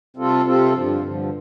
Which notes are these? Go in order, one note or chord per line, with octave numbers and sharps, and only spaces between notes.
C3 G3 C4 F4 A4
C3 G3 C4 F4 A4
G2 D3 F3
G2 D3 F3